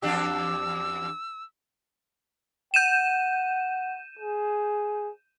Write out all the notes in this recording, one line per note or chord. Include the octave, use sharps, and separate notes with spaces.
E2 D4 G4 E6
F#5 G6 D#7 E7
G#4